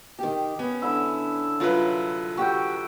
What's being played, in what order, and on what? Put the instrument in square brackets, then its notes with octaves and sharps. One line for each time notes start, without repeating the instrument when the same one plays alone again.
[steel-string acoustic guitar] D#3 G4
[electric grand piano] B3 [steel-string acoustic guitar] C#4
[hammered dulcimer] D3 E4 E5
[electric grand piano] C2 F#3 B4 [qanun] F4 D5
[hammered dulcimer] F#4 E5 G5 [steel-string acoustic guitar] G4